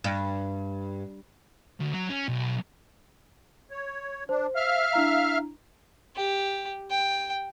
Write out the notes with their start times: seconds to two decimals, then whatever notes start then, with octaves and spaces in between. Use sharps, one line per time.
0.04 G2
1.80 D2
1.93 F#3
2.09 C#4
2.28 B1
3.71 C#5
4.29 D4 C5
4.56 E5 F5 F6
4.93 D4 E4 A#5
6.16 G4
6.91 G5